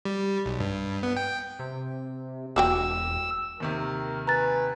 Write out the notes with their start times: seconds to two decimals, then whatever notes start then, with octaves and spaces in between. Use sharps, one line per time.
0.05 G3
0.46 B1
0.60 G2
1.03 B3
1.16 G5
1.59 C3
2.56 E1 A#3 F#4 G5 E6
3.60 D#2 C3 D#3 A#4
4.27 B4 G#5 A#5 A6